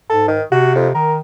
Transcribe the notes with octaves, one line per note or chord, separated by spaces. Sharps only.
G#2 A4
D#3
C3 F#4
F2
D#3 A#4